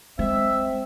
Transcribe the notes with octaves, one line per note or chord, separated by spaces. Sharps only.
G#3 C4 E5